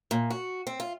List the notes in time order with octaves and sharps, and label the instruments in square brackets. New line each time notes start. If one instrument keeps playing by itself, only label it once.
[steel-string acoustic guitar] A#2
F#4
C4
F4